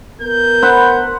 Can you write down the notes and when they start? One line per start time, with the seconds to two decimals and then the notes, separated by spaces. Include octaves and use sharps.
0.22 B3 A#4 G6
0.62 C5 F#5 B5